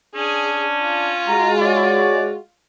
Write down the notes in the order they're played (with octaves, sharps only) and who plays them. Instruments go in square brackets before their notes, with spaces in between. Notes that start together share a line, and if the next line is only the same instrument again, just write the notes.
[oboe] C#4 [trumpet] D4 [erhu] G#4
[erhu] F4
[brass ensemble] G#3 F#4 [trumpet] A#5
[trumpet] C#5 [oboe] D5